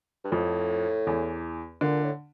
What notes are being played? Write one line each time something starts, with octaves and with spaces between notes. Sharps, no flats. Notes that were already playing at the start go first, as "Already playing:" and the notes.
G2
F2 A2 F3
E2 E3
A#2 D3
A2